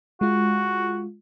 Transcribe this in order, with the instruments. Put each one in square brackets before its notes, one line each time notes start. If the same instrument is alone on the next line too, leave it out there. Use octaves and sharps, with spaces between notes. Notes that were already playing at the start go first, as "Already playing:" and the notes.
[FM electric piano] G#3 F4 [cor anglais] F#4